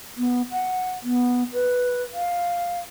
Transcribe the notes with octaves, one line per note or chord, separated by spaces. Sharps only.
B3
F#5
B3
B4
F5